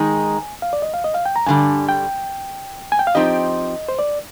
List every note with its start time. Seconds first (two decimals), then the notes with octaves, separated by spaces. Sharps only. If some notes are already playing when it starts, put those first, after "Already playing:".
Already playing: D#3 G#3 D#4 G#4 G#5
0.62 F5
0.73 D5
0.82 D#5
0.94 F5
1.04 D#5
1.14 F5
1.26 G5
1.36 A#5
1.46 G2 D3 G3 G#5
1.89 G5
2.92 G#5
2.99 G5
3.07 F5
3.15 F3 C4 D#4 G4 D#5
3.89 C5
3.99 D5